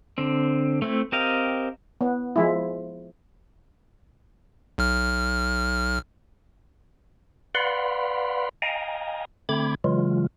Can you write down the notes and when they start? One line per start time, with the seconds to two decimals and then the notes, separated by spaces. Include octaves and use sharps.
0.18 D3 C4
0.82 A3 C4 E4
1.12 C4 G4 A#4 D#5 F5
2.01 B3
2.36 F3 G#3 E4
4.78 B1 F6
7.55 B4 D5 F5 F#5 B5 C6
8.62 D#5 F5 G5 G#5 A#5
9.49 D3 A3 C4 B5 D6 G#6
9.84 C#3 E3 F#3 G#3 F4